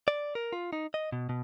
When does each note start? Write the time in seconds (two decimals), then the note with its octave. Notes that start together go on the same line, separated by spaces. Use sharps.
0.08 D5
0.35 A#4
0.53 F4
0.73 D#4
0.94 D#5
1.12 B2
1.29 B2